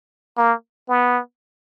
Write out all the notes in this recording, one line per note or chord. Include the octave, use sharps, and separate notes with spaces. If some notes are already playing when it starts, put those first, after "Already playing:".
A#3
B3